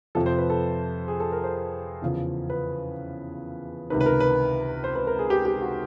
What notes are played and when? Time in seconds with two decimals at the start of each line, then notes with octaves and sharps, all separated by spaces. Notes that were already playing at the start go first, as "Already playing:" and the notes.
0.15 F2 C3 F3 A4
0.26 C5
0.38 B4
0.50 A4
1.08 G#4
1.20 A4
1.32 A#4
1.44 C5
2.02 E2 C#3 F3
2.50 B4
3.90 C#2 C3 D#3 B4
4.01 B4
4.06 A#4
4.20 B4
4.84 C5
4.96 B4
5.07 A#4
5.19 G#4
5.30 G4
5.45 G4
5.62 F#4